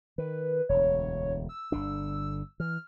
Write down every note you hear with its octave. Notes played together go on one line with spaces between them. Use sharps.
D#3 B4
E1 D2 C#5
E6
G1 D3 D4
E3 F6